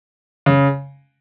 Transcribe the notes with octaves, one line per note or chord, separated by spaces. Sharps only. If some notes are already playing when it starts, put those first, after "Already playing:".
C#3